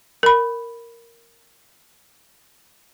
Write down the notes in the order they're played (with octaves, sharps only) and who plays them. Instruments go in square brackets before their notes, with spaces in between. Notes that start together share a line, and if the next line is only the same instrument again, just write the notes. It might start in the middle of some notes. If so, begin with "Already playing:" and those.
[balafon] A#4 B5